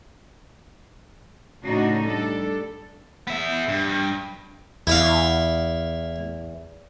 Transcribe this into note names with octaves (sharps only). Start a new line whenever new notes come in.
A2 C#3 D4 D#4 F#4
G3 D4 A4
B3 E5
G2
E2 E4 E5 F5